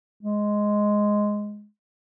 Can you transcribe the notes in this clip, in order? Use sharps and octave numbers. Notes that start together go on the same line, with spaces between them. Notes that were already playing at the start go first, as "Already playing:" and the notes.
G#3